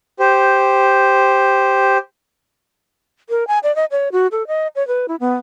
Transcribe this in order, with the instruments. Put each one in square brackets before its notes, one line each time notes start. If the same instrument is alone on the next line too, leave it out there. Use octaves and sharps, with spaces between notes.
[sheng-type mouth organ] G4 C5
[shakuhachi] A#4
G#5
D5
D#5
C#5
F#4
A4
D#5
C#5
B4
E4
B3